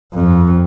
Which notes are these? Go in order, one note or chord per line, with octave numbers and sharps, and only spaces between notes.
F2